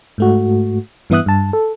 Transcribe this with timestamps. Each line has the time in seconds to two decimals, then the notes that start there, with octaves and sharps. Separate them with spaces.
0.18 G#2 A3 F#4
1.10 G2 E3 B3 E5 D#6 F#6
1.26 G2 A5
1.53 A4